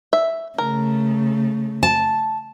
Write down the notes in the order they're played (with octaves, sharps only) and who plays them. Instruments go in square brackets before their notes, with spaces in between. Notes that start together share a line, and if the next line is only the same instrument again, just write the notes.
[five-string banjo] E5
[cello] C#3 A3 [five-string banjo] A#4
[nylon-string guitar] A5